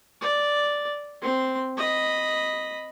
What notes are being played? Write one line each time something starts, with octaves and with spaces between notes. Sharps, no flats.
D5
C4 C6
D#5 B5